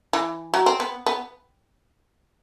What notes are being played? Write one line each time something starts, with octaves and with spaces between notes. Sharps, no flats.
E3
F#3
C4
B3
B3